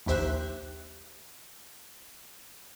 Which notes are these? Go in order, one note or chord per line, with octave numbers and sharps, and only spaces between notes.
A#1 D#2 G4 C5 E5 F#6